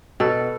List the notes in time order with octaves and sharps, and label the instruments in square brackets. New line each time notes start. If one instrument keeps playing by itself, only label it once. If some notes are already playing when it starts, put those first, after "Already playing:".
[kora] B2 A4